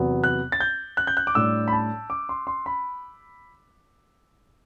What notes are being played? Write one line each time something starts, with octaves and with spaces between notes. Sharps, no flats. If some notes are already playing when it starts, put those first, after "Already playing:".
Already playing: E2 C3 F#3 B3
F#6
A6
G6
F#6
G6
F#6
D6
A2 G3 D4 E6
B5
A5
D6
C6
C6
B5